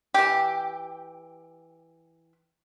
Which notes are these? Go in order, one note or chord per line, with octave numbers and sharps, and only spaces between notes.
E3 G4